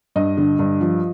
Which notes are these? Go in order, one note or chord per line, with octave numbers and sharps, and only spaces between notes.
G2 D#5
D3
G2
F3